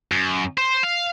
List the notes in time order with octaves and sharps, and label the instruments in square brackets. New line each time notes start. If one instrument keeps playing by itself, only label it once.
[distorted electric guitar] F#2
C5
F5